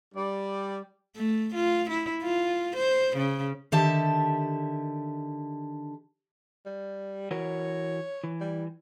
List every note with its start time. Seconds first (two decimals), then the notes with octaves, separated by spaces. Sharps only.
0.15 G3 D5
1.16 A3
1.55 F4
1.90 E4
2.23 F4
2.76 C5
3.17 C#3
3.72 D3 D#3 G4 E5 A5
6.66 G3
7.31 E3 F#4 A#4 C#5
8.24 E3
8.40 G3